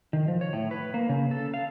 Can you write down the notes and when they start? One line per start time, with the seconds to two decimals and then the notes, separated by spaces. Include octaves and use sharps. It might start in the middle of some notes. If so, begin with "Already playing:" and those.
0.13 D#3
0.28 F3
0.41 C#5
0.53 A2
0.71 B4
0.94 A#3
1.09 C#3
1.31 A4
1.54 F5